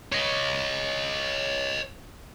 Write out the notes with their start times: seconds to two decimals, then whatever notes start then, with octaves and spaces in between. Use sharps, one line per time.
0.12 C#5 D#5